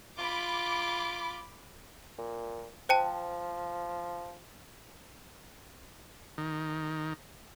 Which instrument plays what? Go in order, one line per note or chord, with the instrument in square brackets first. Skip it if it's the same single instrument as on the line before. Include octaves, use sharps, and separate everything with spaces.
[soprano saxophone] F4 [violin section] B5 D6
[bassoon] A#2
[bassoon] F3 [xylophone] C5 G5 A5
[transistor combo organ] D#3